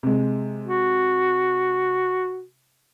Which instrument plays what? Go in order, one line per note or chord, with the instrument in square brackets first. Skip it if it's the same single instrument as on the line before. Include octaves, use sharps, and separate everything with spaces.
[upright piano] C3 G#3
[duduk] F#4